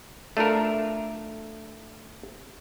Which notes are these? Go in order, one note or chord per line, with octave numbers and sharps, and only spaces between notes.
A3 D4 F4 A4 A#4